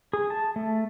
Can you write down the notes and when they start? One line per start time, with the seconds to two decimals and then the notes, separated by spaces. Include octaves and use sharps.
0.13 G#4
0.30 A5
0.56 A3